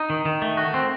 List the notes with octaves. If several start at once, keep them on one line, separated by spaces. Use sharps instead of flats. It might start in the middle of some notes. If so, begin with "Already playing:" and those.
Already playing: D#4
D#3
D#3
A3
F#4
C4